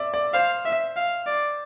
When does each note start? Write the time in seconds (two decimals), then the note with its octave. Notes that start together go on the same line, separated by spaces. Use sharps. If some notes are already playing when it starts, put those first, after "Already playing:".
Already playing: D5 E5
0.14 D5
0.34 C5 F5
0.65 E5
0.96 F5
1.27 D5